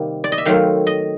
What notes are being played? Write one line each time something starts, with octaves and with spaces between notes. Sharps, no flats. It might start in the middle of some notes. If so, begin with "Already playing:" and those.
Already playing: C3 D#3 G3 A#3
D5
D#5
E5
D#3 F#3 A3 C4 F5
D#5